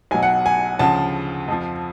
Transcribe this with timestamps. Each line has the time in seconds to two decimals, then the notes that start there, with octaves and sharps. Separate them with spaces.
0.11 B1 B2 F#3 G#5
0.23 F#5
0.46 G#5
0.79 D2 C#3 F3 A5
1.48 F2 F3